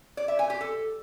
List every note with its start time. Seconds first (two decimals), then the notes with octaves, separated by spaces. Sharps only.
0.17 D5
0.28 E5
0.39 G#5
0.50 G4
0.61 A4